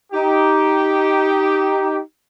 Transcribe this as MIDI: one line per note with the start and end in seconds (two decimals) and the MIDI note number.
0.12 1.99 63
0.12 1.99 67